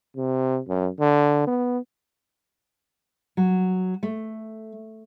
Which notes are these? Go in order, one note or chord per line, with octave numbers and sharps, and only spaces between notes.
C3
F#2
D3
B3
F#3
A3